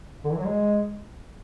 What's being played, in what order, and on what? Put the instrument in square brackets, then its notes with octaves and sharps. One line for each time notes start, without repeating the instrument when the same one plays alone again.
[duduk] D3
E3
F#3
G#3